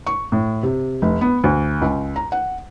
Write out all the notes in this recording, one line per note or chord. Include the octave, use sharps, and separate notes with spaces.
C#6
A2
C3
F1
B3
D2
C#2
A#5
F#5